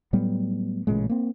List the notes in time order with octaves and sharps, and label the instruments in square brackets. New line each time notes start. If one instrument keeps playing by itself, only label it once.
[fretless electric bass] A2 F#3 G3 B3
A1 A#2 C#3 G#3
A#3 C4